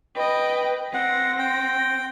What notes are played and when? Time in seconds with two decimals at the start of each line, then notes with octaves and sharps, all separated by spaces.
0.16 B4 D#5 G5
0.94 C4 F#5 A#6
1.39 G5